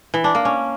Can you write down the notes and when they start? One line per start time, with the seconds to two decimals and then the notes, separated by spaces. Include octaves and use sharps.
0.14 E3
0.24 D4
0.35 A#3
0.45 C#4